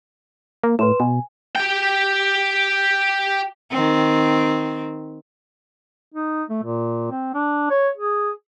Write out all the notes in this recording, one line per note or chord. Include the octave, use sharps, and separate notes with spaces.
A#3
A2 B4 C6 E7
B2 G#5
G4 G5
D#3 C4
D#4
A3
A#2
C4
D4
C#5
G#4